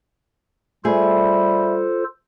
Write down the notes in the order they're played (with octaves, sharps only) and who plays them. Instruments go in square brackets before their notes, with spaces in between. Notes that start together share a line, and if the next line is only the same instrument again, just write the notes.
[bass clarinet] G3 [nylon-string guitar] A3 G#4 [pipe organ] F4 A4 C5